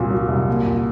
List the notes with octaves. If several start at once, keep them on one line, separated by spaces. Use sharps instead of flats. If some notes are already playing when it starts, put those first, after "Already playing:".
Already playing: C2 A#2 F#3 A#3
F#3
C2
A#3
A#2